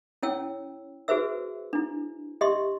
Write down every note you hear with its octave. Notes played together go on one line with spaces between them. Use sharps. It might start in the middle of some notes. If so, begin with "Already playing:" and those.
C#4 E4 C#5 G5 E6
F#4 G#4 B4 C5 E5 E6
D4 E4
G4 D#5 E5 C6 C#6